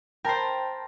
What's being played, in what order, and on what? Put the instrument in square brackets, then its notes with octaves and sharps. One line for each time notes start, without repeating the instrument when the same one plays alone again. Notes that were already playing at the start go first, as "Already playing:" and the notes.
[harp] A#4 C5 [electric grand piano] G5 A5 B5